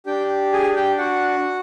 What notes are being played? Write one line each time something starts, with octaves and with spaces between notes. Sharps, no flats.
D4 G4 G5
G#4 G#5
G4 G5
F#4 F#5